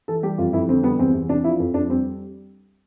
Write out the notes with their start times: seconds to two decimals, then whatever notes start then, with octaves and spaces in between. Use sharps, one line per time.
0.08 E3 A4
0.23 G3 G4
0.38 F2 F4
0.53 F2 E4
0.68 D3 C4
0.83 G3 B3
0.99 E2 C4
1.14 E2
1.29 C3 D4
1.44 F3 E4
1.60 F2
1.74 F2 D4
1.90 G3 C4